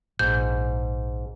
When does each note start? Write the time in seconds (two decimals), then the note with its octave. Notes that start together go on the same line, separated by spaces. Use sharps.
0.19 A#1 G#2 G6